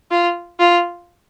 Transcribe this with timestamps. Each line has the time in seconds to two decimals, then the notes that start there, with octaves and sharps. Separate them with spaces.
0.11 F4
0.59 F4